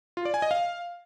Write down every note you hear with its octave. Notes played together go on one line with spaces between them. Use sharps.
F4
D5
G#5
D#5
F5